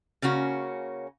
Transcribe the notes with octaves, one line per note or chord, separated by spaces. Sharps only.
C#3 A#3 C#4 F#4